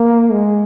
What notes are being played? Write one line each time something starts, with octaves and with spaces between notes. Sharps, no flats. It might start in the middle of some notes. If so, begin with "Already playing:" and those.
Already playing: A#3
G#3